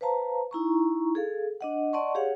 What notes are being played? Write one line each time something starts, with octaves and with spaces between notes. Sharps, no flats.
B4 C5 F5 A5 A#5
D#4 E4 A#5 C#6
G#4 A4 F5
D4 D#5 F#5
D5 D#5 F#5 A5 C6 C#6
G4 G#4 C#5 F5 F#5